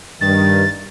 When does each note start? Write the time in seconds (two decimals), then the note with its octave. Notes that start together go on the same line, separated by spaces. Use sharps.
0.21 G2 D#3 A6